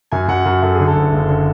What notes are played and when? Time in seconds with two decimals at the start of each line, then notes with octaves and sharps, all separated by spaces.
0.12 F#2 G#5
0.28 F#2 F#5
0.45 F#2
0.62 F#2 A4
0.74 D3 G#4
0.87 A4
0.95 F#1
1.12 F#1
1.29 D3